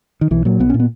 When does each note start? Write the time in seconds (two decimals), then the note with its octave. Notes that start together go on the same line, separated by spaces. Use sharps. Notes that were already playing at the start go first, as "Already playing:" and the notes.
0.21 D#3
0.31 B1 E3
0.45 A#2 F#3
0.60 B1 B3
0.70 A#2 C#4
0.80 B3